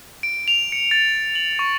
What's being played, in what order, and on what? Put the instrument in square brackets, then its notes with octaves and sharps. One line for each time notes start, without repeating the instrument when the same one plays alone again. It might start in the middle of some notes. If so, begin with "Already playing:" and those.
[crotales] D7
F7
C#7
A6
F#7
C#6